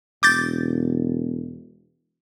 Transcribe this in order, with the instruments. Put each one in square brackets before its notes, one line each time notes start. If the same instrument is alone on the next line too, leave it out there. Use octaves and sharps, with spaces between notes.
[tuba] E1 [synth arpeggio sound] D6 G6 A6